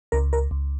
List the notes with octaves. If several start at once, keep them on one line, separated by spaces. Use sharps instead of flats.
C#2 A#4
A#4
C#2